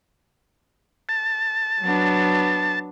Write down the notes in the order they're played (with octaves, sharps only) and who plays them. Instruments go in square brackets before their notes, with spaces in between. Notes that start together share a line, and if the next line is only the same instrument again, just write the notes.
[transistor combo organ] A5
[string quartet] F#3 B3 D4